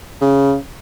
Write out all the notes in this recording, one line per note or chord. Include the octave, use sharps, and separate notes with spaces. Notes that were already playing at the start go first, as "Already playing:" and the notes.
C#3